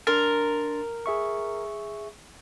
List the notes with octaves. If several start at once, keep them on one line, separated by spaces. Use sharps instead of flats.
D4 A#4 C6 A6
G#4 E5 C#6